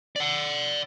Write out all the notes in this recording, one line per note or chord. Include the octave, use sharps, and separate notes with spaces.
D5 F#5